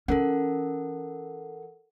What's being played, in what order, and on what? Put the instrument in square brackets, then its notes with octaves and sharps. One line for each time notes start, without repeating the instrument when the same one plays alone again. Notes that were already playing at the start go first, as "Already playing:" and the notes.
[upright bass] E3 C#4 [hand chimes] A4 A#4 F#5